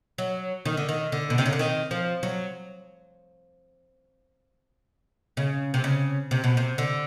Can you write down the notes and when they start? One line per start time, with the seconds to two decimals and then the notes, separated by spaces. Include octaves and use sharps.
0.18 F#3
0.65 D#3
0.77 D3
0.89 D#3
1.12 D3
1.30 B2
1.38 C3
1.46 C#3
1.53 D3
1.59 D#3
1.91 F3
2.23 F#3
5.37 C#3
5.74 C3
5.84 C#3
6.31 C3
6.44 B2
6.57 C3
6.78 D3